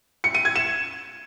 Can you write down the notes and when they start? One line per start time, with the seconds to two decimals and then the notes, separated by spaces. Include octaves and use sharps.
0.24 C#7
0.34 D#7
0.45 G#6
0.56 E7